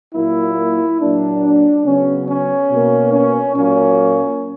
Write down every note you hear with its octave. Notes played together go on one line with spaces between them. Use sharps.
A#2 F#3 A#3 E4
A#2 F#3 A#3 D4
C#3 F#3 B3 C#4
C#4
B2 A#3
C#4
A#2 F#3 A#3 C#4